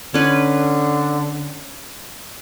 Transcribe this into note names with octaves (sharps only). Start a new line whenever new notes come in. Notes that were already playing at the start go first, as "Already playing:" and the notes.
D3 C#4 B4